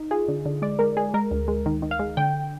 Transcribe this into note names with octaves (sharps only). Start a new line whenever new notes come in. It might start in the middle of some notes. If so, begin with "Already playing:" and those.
Already playing: D#4
F4 G#4
D3
D3
G#3 D5
G#3 A#4
G#3 G#4
G#3 A#4
D2
G#3
D#3
D#3
F5
G#3
D3 G5